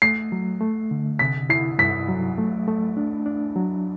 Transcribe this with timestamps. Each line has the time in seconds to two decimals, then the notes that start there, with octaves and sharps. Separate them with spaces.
0.02 A3 C7
0.32 F#3
0.60 A3
0.91 D3
1.19 C3 B6
1.50 E4 C7
1.78 G2 B6
2.09 F#3
2.38 A3
2.67 A3
2.97 D4
3.26 D4
3.56 F#3